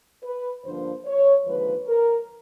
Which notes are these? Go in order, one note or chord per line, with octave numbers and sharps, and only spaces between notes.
B4
G2 D3 F3 A#3 D4 C5
C#5
D#2 D3 F3 G#3 B4
A#4